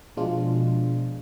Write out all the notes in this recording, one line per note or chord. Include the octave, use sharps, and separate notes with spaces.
B2 F3 G#3 D4 F4